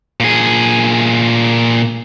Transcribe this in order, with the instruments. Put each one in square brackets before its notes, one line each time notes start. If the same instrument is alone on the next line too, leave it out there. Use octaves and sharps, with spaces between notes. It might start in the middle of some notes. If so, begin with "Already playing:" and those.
[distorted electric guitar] A#2 G#4